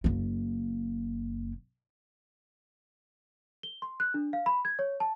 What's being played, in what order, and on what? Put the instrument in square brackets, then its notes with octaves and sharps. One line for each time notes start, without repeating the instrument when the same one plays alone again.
[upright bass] F#1 A#3
[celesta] G7
C6
F#6
D4
F5
B5
G#6
C#5
A5